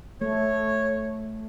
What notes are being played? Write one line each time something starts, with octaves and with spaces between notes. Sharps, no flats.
A3 C#5